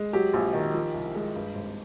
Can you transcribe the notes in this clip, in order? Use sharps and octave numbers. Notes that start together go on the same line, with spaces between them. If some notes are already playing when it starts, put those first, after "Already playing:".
Already playing: G#3
F#3 G4
A#1
D#3
F3
C2
G#3
G2
G#1